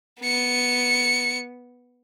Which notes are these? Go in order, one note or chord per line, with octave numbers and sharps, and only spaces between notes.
B3 C#7